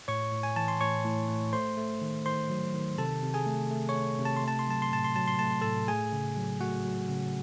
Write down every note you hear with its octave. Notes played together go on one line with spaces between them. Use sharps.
A2 C#5 C#6
A2
G#5
E3 A5
C6
A2 C#5 C#6
A2
A3
A3 C5 C6
A3
D#3
D#3 C5 C6
F#3
D#3
C3 A4 A5
C3
G#4 G#5
A3
A3
C#5 C#6
A3
C3
A5
C6
A3 A5
C6
F#3 A5
C6
A2 A5
C6
F#3 A5
C6
A3 A5
C6
A2 A4 A5
A3 G#4 G#5
C#3
F#3
A3 F#4 F#5
F#3
C#3